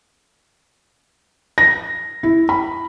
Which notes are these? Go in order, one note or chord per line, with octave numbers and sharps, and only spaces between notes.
A#6
E4
B5